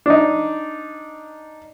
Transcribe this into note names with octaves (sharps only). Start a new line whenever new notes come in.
D4 D#4